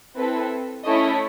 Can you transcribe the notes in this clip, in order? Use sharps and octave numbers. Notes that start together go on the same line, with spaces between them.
C4 E4 A4 B4
A3 C#4 E4 A4 D#5